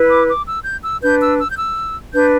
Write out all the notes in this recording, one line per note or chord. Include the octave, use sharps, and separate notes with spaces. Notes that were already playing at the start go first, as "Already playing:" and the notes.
Already playing: E4 B4
D6
D6
E6
G6
E6
D4 B4 G6
E6
E6
G6
E6
D4 B4 G6